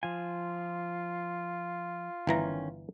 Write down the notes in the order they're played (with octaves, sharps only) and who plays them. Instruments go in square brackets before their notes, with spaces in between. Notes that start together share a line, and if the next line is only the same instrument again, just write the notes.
[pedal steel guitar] F3 G#5 [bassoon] F4
[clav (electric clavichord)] G1 E3 A#5 [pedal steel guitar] D#3 C#4